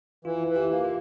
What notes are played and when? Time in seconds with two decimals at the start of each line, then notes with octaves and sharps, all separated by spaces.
0.25 E3 F4
0.48 E3
0.56 G4
0.70 A#3
0.85 F4